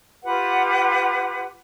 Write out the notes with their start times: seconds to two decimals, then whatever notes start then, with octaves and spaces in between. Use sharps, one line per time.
0.24 F4 G4 B4 F#5